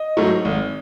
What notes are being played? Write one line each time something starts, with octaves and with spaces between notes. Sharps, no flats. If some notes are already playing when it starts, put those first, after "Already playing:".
Already playing: D#5
G#2 F#3 A3
G#1